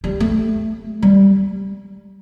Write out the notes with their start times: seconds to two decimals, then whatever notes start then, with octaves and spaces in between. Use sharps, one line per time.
0.04 G3
0.20 A3
1.02 G3